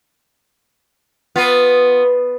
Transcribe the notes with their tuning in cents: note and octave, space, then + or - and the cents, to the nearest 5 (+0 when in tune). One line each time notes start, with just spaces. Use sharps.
B3 +0 F4 +10